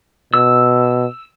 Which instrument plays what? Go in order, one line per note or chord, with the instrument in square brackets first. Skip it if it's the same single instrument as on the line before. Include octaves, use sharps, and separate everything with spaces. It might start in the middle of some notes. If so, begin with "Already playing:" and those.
[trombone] B2 [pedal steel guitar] E6